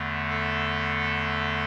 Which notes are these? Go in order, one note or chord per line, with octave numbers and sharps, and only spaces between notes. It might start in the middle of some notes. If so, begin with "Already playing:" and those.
Already playing: E2 D3 A3
A4